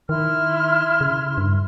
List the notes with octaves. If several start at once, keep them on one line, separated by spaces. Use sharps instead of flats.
D#3 E4 C6 F6
C#3
G2